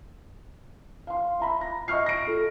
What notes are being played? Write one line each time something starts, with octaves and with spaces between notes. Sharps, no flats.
F5 C6
E5 A#5 B5
A#6
D#5 E5 C#6 F6 C7
A#6 D7
F4 A4